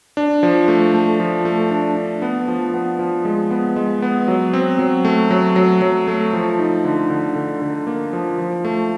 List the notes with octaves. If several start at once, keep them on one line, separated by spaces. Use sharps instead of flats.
D4
F3
A3
A3
F3
A3
D4
D4
B3
F3
B3
F3
G#3
B3
G#3
B3
F#3
C4
F#3
A3
F#3
F#3
F#3
A3
F3
D#4
D3
D3
D3
D3
A#3
F3
F3
A3